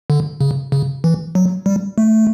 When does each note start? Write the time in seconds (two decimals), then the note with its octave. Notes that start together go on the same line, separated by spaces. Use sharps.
0.10 D3
0.41 C#3
0.72 C#3
1.04 E3
1.35 F#3
1.66 G3
1.98 A3